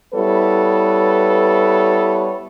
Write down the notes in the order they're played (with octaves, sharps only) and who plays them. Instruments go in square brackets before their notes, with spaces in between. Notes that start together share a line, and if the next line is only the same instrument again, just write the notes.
[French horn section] G3 B3 E4 A4 B4 C#5